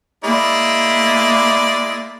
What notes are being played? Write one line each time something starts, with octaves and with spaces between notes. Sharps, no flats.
G#3 A#3 E4 D5